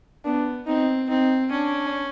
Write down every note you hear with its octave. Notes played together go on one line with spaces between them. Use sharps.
B3 D4
C4 D#4
C4 D#4
C#4 D4